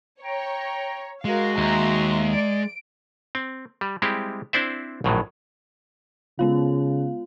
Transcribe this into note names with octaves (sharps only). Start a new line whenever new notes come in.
C#5 G5 A#5
G#3 F#4 A#4 F5
D#2 E5 A#5 C6
D5 D7
C4
G3
G3 G#3 C4 E4 G4
C4 D4 E4 C5 D5 E5
A#1 F#2 A2 D#3 F#3
C#3 G#3 B3 F4 F5